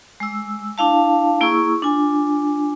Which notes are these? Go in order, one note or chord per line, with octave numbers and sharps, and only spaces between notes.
G#3 E6
D4 E4 F5 A5
A#3 E4 G#4 C#6 E6
D4 F4 G#5